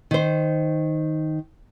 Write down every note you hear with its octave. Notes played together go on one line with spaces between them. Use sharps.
D#3 C5